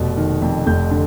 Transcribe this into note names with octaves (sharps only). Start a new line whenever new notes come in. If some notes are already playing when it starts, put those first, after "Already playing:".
Already playing: F1 B2
D#3
F2
F1 G6
D3